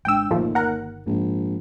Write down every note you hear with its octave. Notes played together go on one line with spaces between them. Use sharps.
G#1 G#3 D4 G5 E6
G1 D#2 A#2 D#3 F3 A3
A#4 F#5
A#1 G#2